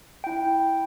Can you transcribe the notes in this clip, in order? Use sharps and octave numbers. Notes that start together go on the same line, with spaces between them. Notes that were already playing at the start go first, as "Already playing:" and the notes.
E4 G5